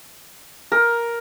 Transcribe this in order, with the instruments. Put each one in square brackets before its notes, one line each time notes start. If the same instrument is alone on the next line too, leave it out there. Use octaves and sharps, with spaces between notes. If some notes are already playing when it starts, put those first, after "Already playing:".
[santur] A#4